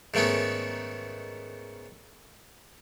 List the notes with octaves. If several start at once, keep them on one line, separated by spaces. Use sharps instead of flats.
G#2 D#3 A3 B3 C#4